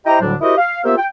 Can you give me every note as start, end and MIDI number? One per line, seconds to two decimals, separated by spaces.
0.06 0.18 64
0.06 0.18 67
0.06 0.18 72
0.06 0.18 75
0.06 0.18 79
0.06 0.18 82
0.21 0.35 38
0.21 0.35 45
0.21 0.35 50
0.21 0.35 54
0.21 0.35 55
0.21 0.35 62
0.41 0.58 64
0.41 0.58 66
0.41 0.58 67
0.41 0.58 70
0.41 0.58 72
0.41 0.58 75
0.58 0.80 77
0.85 0.95 58
0.85 0.95 59
0.85 0.95 65
0.85 0.95 67
0.85 0.95 72
0.85 0.95 76
0.98 1.05 79